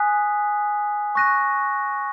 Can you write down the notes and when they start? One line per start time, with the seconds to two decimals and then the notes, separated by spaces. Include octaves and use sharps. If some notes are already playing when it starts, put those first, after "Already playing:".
Already playing: G#5 D#6 F#6 B6
1.15 C#6 F#6 A#6 D#7